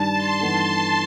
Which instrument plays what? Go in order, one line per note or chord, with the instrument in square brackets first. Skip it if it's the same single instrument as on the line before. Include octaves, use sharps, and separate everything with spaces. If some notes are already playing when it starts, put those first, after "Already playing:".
Already playing: [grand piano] G2 D#3 G3 [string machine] A5
[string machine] C6
[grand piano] G2 E3 B3 D#4 A4